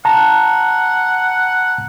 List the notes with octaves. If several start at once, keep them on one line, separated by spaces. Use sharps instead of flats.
F#5 A5 A#5